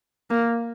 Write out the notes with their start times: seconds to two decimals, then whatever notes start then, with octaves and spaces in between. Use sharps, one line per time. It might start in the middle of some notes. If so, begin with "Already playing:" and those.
0.30 A#3